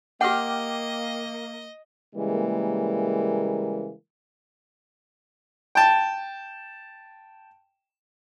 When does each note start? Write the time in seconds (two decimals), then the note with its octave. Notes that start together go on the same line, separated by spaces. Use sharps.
0.21 A#3 G4 D#5 F#5 G5 D6 F6
2.16 C#3 E3 G3 G#3 A#3
5.75 G5 A5